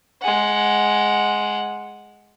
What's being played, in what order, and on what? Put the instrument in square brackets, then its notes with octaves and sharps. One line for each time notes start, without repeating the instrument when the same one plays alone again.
[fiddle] G#3 F#5